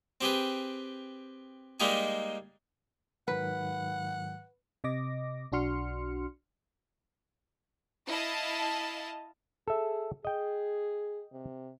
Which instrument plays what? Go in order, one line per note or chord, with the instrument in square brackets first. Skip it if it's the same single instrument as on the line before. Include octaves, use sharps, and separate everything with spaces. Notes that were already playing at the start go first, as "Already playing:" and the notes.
[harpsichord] C4 G4 G#4 B4
G3 G#3 A#3 D#4 G4 G#4
[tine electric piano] G#2 D#3 F#3 [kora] B4 [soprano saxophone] F#5
[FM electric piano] C3 D#5 D6 A#6
B1 D4 F#4 C6 F6 C#7
[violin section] E4 D#5 F5 A5
[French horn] G#4 [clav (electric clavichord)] A4 E5
[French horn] G#4 [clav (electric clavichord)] D#5 G5
[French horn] C3